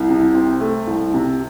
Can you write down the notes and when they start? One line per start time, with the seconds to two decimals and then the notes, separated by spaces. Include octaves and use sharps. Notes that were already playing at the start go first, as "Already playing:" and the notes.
Already playing: C2
0.09 C3
0.35 C4
0.61 A3
0.87 C2
1.14 C3